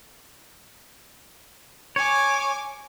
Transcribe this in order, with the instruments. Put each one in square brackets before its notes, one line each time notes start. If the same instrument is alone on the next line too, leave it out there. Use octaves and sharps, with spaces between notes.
[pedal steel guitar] C#5 [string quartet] G#5 D6